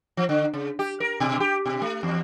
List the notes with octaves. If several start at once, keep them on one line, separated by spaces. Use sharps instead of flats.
F3
D3
C#3
G4
A#4
B2
G4
B2
A3
E2